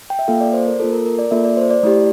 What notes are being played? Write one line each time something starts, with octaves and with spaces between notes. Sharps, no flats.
G5
E5
A#3 F4 A4 F5
D5
C5
A#4
A#3 F4 A4
A#4
A#4
D5
A#3 F4 A4 E5
D5
C5
D5
A3 E4 G4